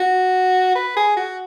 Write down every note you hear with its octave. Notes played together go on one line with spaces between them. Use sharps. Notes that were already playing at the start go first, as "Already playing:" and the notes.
Already playing: F#4
B4
G#4
F#4